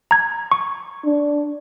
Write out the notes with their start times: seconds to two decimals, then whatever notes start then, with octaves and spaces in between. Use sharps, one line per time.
0.11 A#5 G#6
0.52 C#6
1.05 D4